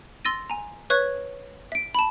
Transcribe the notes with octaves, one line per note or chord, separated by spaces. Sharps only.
C6 E6 A6 A#6 D#7
G#5 A#5
B4 C#5 E5 C#6 F#6 G#6
E5 D7
A5 B5